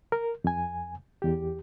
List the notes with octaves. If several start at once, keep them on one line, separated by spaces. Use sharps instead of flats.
A#4
F2 G#5
E2 G4